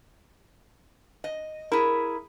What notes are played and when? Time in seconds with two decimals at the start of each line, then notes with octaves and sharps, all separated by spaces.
1.24 D#5
1.72 E4 G#4 A#4 B5